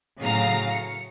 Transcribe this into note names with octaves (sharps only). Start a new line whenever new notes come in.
A2 C#3 F#3 F5 A#5
C#7